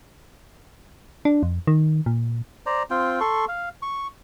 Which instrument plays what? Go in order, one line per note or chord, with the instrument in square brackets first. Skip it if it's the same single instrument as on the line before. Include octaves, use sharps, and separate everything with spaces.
[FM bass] D4
F2
D#3
A#2
[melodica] C5 D5 A#5
C4 F4 G5
A4 C6 C#6
F5
C#6